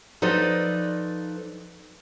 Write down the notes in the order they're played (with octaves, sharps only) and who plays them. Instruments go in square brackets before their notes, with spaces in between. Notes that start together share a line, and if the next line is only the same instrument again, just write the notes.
[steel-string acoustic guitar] F3 D#4 A4 B4 D5